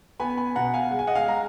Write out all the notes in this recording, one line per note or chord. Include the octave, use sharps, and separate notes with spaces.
B3 G#5 B5
G#5 B5
B2 F#5 A#5
F5 G#5
G#3 F#5
G#5
D#5 F#5
F5 G#5
G#3 A#5